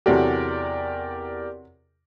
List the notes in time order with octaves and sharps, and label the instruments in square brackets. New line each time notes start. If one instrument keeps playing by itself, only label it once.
[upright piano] E2 A4 [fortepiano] C3 F#3 [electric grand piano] G4 A#4 D5